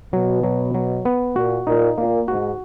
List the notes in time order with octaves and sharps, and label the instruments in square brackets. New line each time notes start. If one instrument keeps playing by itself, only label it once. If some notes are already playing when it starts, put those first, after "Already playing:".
[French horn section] B2 [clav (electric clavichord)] F#3
[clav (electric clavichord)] F#3
F#3
B3
[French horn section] A#2 [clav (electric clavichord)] F#4
[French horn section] A#2 [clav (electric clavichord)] D#4
[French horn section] A#2 [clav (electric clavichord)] A#3
[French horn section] G#2 [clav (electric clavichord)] F#4